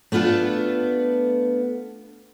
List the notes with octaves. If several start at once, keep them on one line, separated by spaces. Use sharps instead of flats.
A3 B3 D4 F4 A4